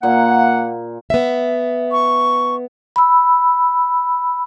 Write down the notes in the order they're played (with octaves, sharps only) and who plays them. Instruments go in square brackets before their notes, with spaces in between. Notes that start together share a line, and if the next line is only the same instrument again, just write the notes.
[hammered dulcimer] A#2 [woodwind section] A#3 F#5
[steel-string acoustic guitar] B3 E5
[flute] C#6
[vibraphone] B5 E6